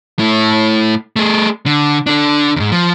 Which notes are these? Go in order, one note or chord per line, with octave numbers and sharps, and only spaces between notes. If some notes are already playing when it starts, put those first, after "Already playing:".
A3 E4
A3 G#4
D3
D3 D4
D#2 G#2
F3